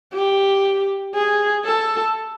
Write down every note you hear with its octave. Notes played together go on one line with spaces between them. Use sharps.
G4
G#4
A4